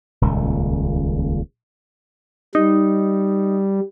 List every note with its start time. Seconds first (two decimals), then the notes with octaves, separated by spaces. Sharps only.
0.21 D#1 C#2 A#2
2.55 G3 D#4